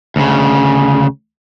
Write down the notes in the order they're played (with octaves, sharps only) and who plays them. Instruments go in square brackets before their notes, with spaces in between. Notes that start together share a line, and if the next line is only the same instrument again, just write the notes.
[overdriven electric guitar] D2 C#3